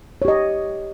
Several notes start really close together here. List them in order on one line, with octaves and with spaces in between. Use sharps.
C#5 G4 D#5